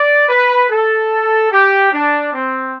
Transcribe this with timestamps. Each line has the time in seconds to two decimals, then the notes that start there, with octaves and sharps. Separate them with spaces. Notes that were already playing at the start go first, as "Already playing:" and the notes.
Already playing: D5
0.29 B4
0.69 A4
1.51 G4
1.92 D4
2.32 C4